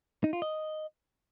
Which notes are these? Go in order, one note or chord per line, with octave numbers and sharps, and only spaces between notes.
D#4
F4
D#5